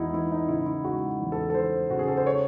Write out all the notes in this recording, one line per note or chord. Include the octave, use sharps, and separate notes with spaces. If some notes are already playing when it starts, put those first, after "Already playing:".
Already playing: E2 G#3 D#4 E4 F#4
E3 E4
D#4
C#3 E4
E4
G#3 F#4
E2
A4
A4
E3 C5
C#3 F#4
G#4
A4
C5
C#5